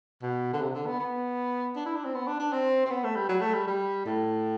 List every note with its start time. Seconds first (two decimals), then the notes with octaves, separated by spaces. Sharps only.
0.23 B2
0.54 D3
0.61 C3
0.75 D3
0.86 B3
1.00 B3
1.76 D4
1.86 E4
1.96 D4
2.05 C4
2.15 B3
2.27 D4
2.40 D4
2.53 C4
2.86 C4
2.90 B3
3.04 A3
3.16 G3
3.29 F#3
3.41 A3
3.54 G3
3.67 G3
4.06 A2